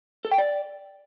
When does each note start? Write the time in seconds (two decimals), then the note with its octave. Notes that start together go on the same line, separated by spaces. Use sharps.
0.25 A4
0.31 G5
0.38 D5